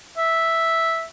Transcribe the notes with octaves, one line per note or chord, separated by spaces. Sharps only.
E5